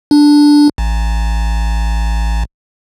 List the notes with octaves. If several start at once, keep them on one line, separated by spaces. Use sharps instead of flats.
D4
A1